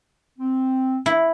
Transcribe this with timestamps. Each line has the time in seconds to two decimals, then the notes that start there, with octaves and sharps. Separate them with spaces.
0.39 C4
1.06 E4